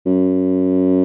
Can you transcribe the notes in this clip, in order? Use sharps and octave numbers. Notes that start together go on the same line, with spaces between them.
F#2